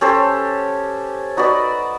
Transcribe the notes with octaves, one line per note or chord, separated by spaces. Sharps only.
C#4 G4 A4 C5
D#4 F#4 B4 D5